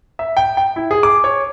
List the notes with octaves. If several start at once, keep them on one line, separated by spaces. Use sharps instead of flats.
E5
G5
G5
E4
G#4
D6
C#5